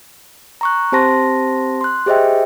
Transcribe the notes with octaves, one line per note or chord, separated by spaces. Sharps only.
A#5 C#6 F#6
C4 G4 C5 A5 C6 A#6
C6 F#6
G4 G#4 C5 D#5 E5 G5